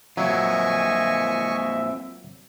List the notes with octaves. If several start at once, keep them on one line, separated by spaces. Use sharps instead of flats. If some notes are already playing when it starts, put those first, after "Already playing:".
F#3 A#3 C4 F4 D#5 E5 G#5 C#6